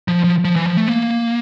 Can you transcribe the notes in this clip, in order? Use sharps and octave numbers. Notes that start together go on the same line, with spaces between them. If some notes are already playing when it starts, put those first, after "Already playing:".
F3
F3
F3
E3
F3
A3
A#3